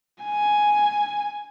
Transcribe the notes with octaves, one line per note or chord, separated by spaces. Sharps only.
G#5